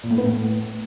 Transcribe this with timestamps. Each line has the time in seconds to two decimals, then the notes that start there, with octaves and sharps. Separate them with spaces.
0.03 A#2
0.11 A2
0.18 B3
0.25 A2